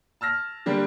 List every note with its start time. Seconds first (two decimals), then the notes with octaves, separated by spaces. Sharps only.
0.21 A5 E6 F6 A#6
0.66 D3 G3 A#3 D4 G4